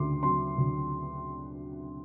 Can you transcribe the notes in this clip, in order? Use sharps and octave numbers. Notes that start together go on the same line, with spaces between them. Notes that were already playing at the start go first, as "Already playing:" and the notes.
Already playing: D2 C#3 C6 D6
F#3 C6
D2